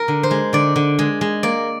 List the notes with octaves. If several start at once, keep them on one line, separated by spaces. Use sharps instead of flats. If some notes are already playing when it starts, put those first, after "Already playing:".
Already playing: A#4
D3
C5
G#3
D3 D5
D3
G#3
G#3
A#3 D5